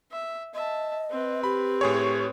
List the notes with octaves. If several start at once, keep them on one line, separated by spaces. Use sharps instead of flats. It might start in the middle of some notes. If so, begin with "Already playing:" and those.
E5
D#5 E5 A5
C4 B4
G4 B5
A2 G#4 C#5